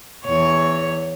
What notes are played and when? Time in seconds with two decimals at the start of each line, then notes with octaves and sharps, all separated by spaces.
0.24 E2 C#5